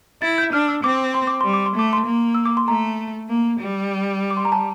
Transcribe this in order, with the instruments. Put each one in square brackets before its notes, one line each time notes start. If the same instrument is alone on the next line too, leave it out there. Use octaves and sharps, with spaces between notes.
[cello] E4 [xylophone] A6
[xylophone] G6
[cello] D4 [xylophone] F6
[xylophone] E6
[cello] C4 [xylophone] D6
[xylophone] C6
D6
[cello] G3 [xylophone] C6
[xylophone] D6
C6
[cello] A3 [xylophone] D6
[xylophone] C6
[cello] A#3
[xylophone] E6
D6
C6
[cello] A3 [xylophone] A#5
[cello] A#3
G3
[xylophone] D6
C6
A#5
A5